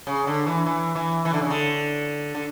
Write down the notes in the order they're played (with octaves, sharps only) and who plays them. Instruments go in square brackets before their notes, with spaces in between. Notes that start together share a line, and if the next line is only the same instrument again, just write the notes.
[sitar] C#3
D3
E3
E3
E3
E3
D3
C#3
D3
D3